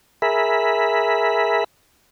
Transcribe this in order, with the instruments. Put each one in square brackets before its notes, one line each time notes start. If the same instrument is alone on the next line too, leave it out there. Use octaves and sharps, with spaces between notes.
[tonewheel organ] G#4 A#4 E5 B5